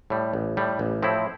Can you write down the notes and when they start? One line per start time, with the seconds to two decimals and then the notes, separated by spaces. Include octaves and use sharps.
0.10 A2 G3
0.33 A1
0.57 A2 G3
0.79 A1
1.03 A2 F3 C4 E4